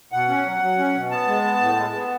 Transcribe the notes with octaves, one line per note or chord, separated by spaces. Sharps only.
B2 F#5
C#4
F#3
F#3
C#4
B2
B3 A5
G#3
B3
A2
G#3
B3